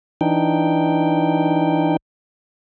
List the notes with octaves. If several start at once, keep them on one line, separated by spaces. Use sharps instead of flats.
E3 D4 D#4 G5